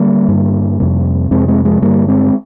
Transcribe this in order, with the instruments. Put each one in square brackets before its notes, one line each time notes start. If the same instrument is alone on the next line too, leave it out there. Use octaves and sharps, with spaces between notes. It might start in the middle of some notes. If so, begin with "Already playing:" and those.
Already playing: [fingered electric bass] D3 G3 A#3
G2 D3
F2 C3
F2 C3 G#3 C4
G#3 C4
F3 G#3
G2 D3 G3 A#3
G#3 C4